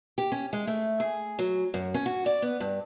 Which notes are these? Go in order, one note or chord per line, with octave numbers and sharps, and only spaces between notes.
G4
C#4
G#3
A3
G#4
F#3
F#2
C#4
F#4
D5
B3
G2